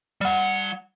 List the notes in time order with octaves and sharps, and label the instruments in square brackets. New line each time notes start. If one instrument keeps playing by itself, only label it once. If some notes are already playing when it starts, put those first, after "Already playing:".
[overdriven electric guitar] G3 F#5